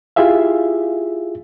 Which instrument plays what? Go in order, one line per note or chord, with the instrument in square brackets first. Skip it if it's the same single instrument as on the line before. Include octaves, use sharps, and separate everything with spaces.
[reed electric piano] E4 F4 G4 G#4 E5 F5